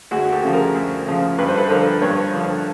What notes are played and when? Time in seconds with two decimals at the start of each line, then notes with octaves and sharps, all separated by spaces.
0.11 D2 F#4 G#4
0.32 G4 A4
0.43 C#3 F3
0.53 G#4 A#4
0.75 D2
1.07 C#3 F3
1.38 G2 B4
1.48 C5
1.58 A4 B4
1.70 D3 F3 A#4 C5
2.02 G2 B4 C#5
2.34 D3 F3